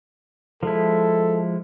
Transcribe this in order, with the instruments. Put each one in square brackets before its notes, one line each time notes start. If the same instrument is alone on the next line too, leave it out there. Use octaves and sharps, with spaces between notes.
[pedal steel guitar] F3 G#3 E4 [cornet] A4